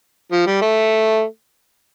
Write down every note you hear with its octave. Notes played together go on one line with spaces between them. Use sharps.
F3
G3
A3